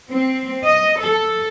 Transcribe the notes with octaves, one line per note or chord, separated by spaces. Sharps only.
C4
D#5
A4